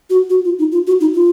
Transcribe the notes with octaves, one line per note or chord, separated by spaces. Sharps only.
F#4
F#4
F4
D#4
F4
F#4
D#4
F4